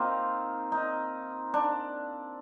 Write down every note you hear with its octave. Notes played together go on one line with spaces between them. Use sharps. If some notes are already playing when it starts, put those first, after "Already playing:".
Already playing: A#3 C4 D#4 F4
D#4
D4